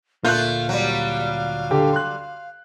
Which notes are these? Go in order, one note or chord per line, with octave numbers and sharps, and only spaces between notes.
D2 A#2 A3 A#3 F4 F5 F#6 G6
F#3 G3
D3 G4 A4
C6 F#6